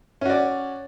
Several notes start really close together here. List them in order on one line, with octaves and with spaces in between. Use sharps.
C#4 F#4 D5